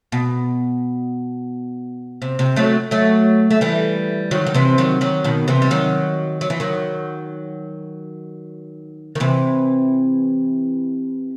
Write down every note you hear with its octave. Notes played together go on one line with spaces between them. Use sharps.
B2
C3
C3
F#3 A3
F#3 A3
A3
E3 G3
D#3 F#3
D#3
C3 E3
D#3 F#3
D#3 F#3
B2 D#3
C3 E3
G3
D#3 F#3
F#3
E3
D#3 F#3
D#3
C3 E3